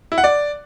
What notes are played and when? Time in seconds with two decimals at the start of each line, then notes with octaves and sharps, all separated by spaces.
0.12 E4
0.18 F#5
0.24 D5